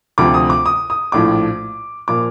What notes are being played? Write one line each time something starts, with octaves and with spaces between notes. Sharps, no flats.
D2 C3 F3 D6
D#6
D6
D#6
D#6
A#1 A2 F3 D6
A#2 F3 D6